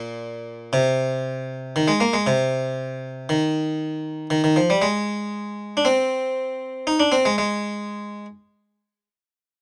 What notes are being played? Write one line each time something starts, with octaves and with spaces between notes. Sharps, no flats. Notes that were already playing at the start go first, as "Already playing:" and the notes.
Already playing: A#2
C3
D#3
G#3
A#3
G#3
C3
D#3
D#3
D#3
F3
G3
G#3
D4
C4
D#4
D4
C4
G#3
G#3